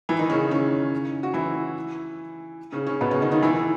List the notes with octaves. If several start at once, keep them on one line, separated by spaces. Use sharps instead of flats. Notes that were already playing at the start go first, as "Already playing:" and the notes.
E3 E4
D#3 D#4
C#3 C#4
C#3 C#4
F#4
E3 E4
C#3 C#4
C#3 C#4
B2 B3
C#3 C#4
D#3 D#4
D#3 D#4
E3 E4